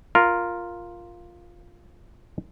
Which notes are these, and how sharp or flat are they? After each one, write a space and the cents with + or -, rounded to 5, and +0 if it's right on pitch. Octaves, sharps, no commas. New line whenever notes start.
F4 +0 A#4 +0